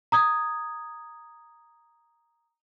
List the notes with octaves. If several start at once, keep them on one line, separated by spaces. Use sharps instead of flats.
A#5 D#6 G#6